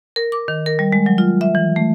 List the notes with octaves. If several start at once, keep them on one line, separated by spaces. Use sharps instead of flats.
A#4
D6
D#3
A#4
G3
G#3
F#3
F4
E5
E3
A3